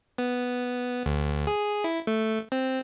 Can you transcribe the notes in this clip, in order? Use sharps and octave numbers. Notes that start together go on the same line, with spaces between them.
B3
D2
G#4
E4
A3
C4